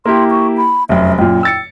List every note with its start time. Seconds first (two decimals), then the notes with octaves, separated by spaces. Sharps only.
0.06 A#3 E4 G4 C6
0.31 C#6
0.57 B5
0.89 F1 F#2 E5
1.19 F#2 A#2 G5
1.43 E6 A6 C#7